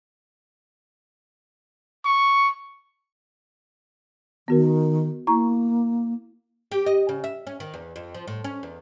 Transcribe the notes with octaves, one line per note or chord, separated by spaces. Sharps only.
C#6
D#3 B3 F#4 A#4
A#3 E4 A#5 C#6
G4
D#5
C#3
E5
C#4
D#3
E2
F2
F3
A2
C#4
E2